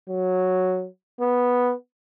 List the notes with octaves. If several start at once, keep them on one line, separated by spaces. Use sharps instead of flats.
F#3
B3